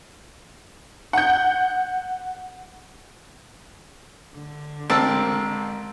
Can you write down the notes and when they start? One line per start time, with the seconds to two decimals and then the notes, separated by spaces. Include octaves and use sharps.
1.13 F#5 G6
4.35 D3
4.90 A1 G#3 C4 A#4 A5 E6